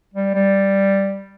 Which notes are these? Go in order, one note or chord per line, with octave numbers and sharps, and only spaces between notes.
G3
G3